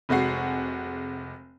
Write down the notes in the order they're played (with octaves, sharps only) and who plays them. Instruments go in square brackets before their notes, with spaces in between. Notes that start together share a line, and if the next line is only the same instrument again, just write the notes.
[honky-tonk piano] F1 C3 G#3 F#4 C7